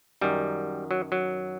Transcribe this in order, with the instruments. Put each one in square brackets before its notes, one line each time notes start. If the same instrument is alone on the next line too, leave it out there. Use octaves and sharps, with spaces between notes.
[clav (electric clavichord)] F#2 D#3 G3
F#3
F#3